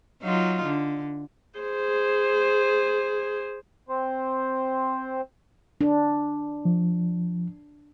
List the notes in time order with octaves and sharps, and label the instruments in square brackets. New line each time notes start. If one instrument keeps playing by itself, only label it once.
[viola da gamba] F#3 D#4 F4
D3
[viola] G#4 C5
[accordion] C4 C5
[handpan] D4
[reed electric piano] F3